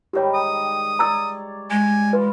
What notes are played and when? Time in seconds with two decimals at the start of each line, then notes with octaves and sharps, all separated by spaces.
0.13 G#2 D#3 G3 G4 C#5
0.35 D#6
0.99 C#5 D5 A#5 E6
1.71 G#3 G#5
2.13 E3 F4 B4